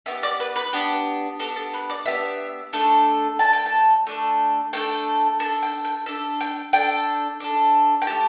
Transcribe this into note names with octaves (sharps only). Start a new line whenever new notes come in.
B3 D4 G4 E5
D5
B4
B4
B3 D4 G4
B3 D4 G4 A4
A4
B4
D5
B3 D4 G4 E5
A3 D4 A4
A3 D4 A4 A5
G5
A5
A3 D4 A4
A3 D4 A4 G5
D4 A4 A5
G5
G5
D4 A4 E5
G5
D4 A4 G5
D4 A4
G5
A3 G4 A5